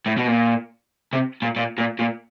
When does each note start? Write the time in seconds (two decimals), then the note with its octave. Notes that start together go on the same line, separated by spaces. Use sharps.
0.06 A2
0.17 B2
0.27 A#2
1.13 C3
1.42 A#2
1.56 A#2
1.78 A#2
1.99 A#2